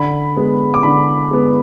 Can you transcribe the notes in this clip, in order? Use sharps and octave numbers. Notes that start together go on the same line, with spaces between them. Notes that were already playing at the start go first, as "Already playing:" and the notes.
Already playing: D3 B5
G#3 B3
D6
D3 B5
G#3 B3